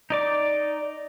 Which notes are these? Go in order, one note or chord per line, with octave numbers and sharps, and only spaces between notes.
D#4 D5 D6